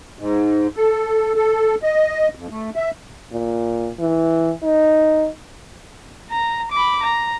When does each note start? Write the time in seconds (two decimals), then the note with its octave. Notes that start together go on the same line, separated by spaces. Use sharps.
0.19 G#2
0.76 A4
1.35 A4
1.83 D#5
2.35 F2
2.50 A3
2.76 E5
3.33 A#2
4.00 E3
4.63 D#4
6.30 A#5
6.72 B5 D6
7.03 A#5